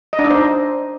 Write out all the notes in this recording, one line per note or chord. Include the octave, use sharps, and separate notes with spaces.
D#5
D4
D#4
C5